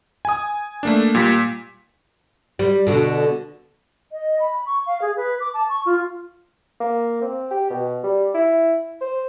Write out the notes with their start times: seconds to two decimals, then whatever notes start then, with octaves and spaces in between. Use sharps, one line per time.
0.25 G#5 D#6
0.83 A3 A#3 D4
1.15 A#2 G3 B6
2.59 G3
2.87 B2 D3
4.12 D#5
4.40 B5
4.66 C#6
4.87 F5
5.02 G#4
5.17 B4
5.40 D6
5.54 A5
5.69 C#6
5.86 F4
6.80 A#3
7.21 C4
7.51 G4
7.70 B2
8.03 G3
8.34 E4
9.01 C5